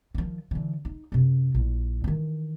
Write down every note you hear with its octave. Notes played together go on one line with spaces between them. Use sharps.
D#3 F3
D3 E3
D#4
F#2 C3
A#1 E4
D#3 E3